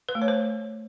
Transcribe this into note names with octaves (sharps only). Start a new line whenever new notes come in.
B4
A3
C#5
C5